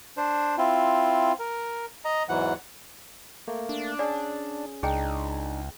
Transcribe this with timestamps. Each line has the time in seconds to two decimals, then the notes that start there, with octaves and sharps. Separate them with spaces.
0.17 D4 C5
0.58 C4 E4 F4
1.39 A#4
2.05 D#5 A#5
2.29 E2 G#2 E3 F#3 F#5
3.48 A3 A#3
3.69 D4
3.99 C#4 G#4 D5
4.83 C#2 D4 D#4 G#4 G5